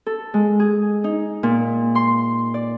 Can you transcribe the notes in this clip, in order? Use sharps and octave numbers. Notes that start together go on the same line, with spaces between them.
A4
G#3
G#4
D#4
A#2
C6
D5